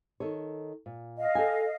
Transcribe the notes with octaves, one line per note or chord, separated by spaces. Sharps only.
D#3 A4 C#5
A#2
D#5 F5
A4 G5 G#5